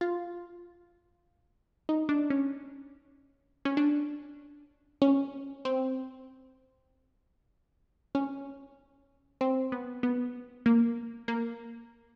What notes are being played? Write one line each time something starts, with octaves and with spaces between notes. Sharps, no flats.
F4
D#4
D4
C#4
C#4
D4
C#4
C4
C#4
C4
B3
B3
A#3
A#3